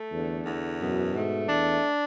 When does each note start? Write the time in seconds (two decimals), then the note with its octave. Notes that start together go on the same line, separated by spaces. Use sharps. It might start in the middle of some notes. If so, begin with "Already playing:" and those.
Already playing: A3
0.12 E2 D3
0.46 E2
0.81 F#2 B2
1.15 G#2 A3
1.49 E2 D4